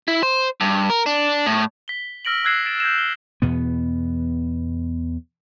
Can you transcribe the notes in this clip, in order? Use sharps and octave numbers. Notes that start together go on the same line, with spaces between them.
E4
C5
G2
A#4
D4
A2
B6 G7
E6 F6 A#6 D7 F#7
E6 F#6 G#6 C7 E7
A6 D7 E7
G6 G#6 A#6 E7
G7
E2 B2 B3